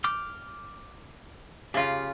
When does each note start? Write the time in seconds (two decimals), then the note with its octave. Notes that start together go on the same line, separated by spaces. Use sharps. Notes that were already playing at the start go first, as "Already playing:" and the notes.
0.04 D6 F6 G6
1.74 C#3 F4 G4